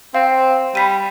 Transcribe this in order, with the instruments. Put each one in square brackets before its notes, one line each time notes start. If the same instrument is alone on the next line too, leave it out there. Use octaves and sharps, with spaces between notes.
[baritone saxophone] C4 [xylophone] F5
[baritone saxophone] G3 [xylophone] B5 B6 D#7